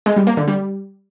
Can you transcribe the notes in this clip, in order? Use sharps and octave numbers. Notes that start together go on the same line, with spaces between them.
G#3
G3
A#3
D3
G3